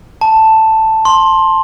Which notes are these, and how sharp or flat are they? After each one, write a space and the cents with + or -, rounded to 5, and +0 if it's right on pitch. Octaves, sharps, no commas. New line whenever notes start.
A5 +5
C6 +15